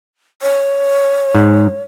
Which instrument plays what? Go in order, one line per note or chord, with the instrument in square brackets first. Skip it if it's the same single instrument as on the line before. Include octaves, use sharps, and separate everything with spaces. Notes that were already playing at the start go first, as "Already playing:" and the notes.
[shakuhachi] C#5
[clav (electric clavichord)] G#2